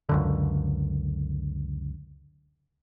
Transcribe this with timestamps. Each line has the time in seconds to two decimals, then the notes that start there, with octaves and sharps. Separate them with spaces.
0.09 C#2 F#2 D3